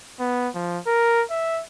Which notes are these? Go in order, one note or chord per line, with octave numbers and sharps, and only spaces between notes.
B3
F3
A#4
E5